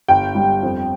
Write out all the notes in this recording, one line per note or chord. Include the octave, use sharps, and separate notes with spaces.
G1 G5
G3
F2